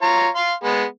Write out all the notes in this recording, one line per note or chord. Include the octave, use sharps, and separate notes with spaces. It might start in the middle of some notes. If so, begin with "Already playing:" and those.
F4 C#5 A#5
F5 C6
G#3 B3